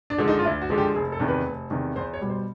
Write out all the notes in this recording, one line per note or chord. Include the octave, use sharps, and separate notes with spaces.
D4
D3 F3 G#3
D#4
F4
D2 E4
F#4
D3 F3 G#3
G4
F1 G#4
A4
E2 C3 D#3
B4
F1
E2 C3 D#3
E2 C5
C#5
B2 G3
C5